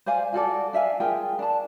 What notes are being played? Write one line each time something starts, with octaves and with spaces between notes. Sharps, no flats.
C5 D5 F5 G#5
F4 F#4 A4 D5
D4 E5 F5 G#5
F4 G#4 A#4 G5
D4 A5